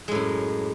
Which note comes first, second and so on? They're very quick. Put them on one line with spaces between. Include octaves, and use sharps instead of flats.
G#3 A2 F#2